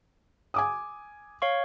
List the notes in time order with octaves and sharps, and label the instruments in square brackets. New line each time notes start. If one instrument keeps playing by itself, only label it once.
[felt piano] G#5 D6 D#6
[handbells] C#5 F5 C#6